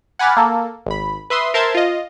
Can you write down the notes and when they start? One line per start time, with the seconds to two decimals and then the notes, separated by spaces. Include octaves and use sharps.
0.19 F#5 G#5 B5 D6 F6 A6
0.37 A#3 A4
0.86 G#1 B5
1.30 B4 E5 C6 D#6
1.54 A#4 C5 E5 A5 C6 G#6
1.75 F4 D#5